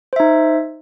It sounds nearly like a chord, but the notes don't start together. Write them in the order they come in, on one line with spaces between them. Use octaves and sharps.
C5 E5 D#4